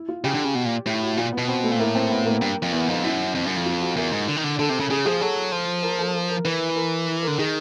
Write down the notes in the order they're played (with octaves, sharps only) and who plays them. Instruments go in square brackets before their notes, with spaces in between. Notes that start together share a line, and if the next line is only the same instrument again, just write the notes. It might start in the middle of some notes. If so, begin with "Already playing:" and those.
Already playing: [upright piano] E4
F4
[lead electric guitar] C#3 [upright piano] G4
[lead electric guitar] D3
C#3
B2
A#2
[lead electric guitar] A2 [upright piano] G4
[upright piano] F#4
[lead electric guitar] A#2 [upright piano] F4
[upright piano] B3
[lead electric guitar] B2
[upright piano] C4
A3
[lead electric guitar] A#2
[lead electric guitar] A2 [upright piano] A#3
[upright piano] C4
B3
A#3
[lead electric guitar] G2
F2
[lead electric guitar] E2 [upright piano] B3
[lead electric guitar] F2 [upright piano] D#4
[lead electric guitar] F#2 [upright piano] E4
[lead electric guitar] F2
F#2
F2
[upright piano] F4
F#4
[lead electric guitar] E2 [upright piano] A#4
[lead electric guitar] G#2
D3
D#3
D3
[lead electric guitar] D3 [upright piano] A4
[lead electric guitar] C3
C#3
[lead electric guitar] C#3 [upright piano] G#4
[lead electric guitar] F3 [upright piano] G#4
[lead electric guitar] F#3 [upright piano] A4
[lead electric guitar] F3
[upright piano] A#4
A4
A#4
A#4
[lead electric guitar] E3 [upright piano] B4
[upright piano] A#4
[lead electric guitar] D3 [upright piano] A#4
[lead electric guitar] D#3 [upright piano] G#4